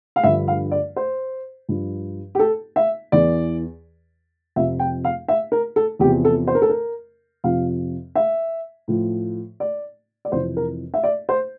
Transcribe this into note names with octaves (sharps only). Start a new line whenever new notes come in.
F5
G2 D3 F3 E5
F5
D5
C5
G2 F3
G4
A4
E5
E2 E3 D5
F2 C3 F3 E5
G5
F5
E5
A#4
A4
E2 C3 F3 G4
A4
C5
A#4
A4
A#4
F2 C3 F3 F5
E5
A2 F3
D5
D5
F2 C3 E3 C5
A#4
E5
D5
C5